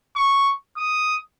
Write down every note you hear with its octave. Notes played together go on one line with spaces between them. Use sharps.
C#6
D#6